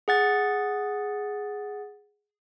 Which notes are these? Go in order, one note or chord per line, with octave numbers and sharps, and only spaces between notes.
G#4 F#5 A6